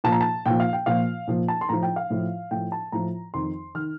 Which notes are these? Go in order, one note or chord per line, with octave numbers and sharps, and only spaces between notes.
A#2 F3 A5
A#5
A5
A#2 F3 G5
F5
G5
A#2 F3 F5
A#2 F3
A5
C6
A2 F3 A#5
G5
F5
A2 F3
A2 F3 G5
A5
A2 F3 A#5
F2 D#3 C6
D#3 F6